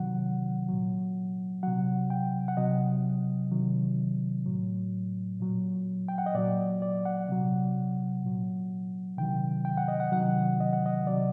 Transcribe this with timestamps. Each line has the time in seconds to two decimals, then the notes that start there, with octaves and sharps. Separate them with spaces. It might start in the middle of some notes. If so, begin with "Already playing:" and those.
Already playing: C3 D#3 F#3 F#5
0.68 A#2 F#3
1.63 C3 F#3 F#5
2.10 G5
2.48 F#5
2.57 C3 F#3 D#5
3.51 C3 D#3 F#3
4.46 A2 F#3
5.40 A#2 F#3
6.08 G5
6.18 F#5
6.26 D#5
6.35 A#2 F#3 D5
6.82 D5
7.05 F#5
7.29 C3 F#3
8.23 A#2 F#3
9.17 C3 D#3 F#3 G5
9.65 G5
9.77 F#5
9.88 D#5
10.00 F#5
10.12 C3 D#3 F#3 F#5
10.60 D#5
10.73 F#5
10.86 D#5
11.07 C3 F#3 D5